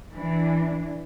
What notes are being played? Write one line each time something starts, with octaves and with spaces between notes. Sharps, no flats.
E3 D4